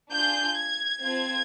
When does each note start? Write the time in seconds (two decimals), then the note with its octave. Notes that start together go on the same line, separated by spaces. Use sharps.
0.13 D4 F4 G#4 G6
0.58 G#6
1.02 C4 F4 A4 G#6